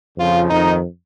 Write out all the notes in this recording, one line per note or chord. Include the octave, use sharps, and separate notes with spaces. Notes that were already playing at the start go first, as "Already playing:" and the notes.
F2 C#3 F3 F4
F2 D#3 D#4